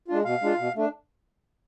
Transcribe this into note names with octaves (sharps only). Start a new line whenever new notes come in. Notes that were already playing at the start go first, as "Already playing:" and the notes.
G#3 D4 F4
B2 F5
G#3 D4 F4
B2
A3 D4